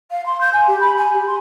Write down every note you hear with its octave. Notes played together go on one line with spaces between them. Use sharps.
F5
C6
G6
G#5
G4
B5
G#5
G4
C6